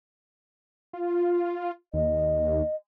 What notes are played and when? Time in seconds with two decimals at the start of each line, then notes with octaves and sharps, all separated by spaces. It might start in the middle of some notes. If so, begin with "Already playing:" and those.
0.93 F4
1.94 D#2 D#5